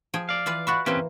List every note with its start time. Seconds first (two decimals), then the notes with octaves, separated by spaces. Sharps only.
0.14 F3 G#4 G5
0.29 D5 F5
0.46 E3 F4 B4
0.67 F4 F#4 E5 B5 C#6 F#6
0.86 E3 A#3 C4 C#4 G4 C5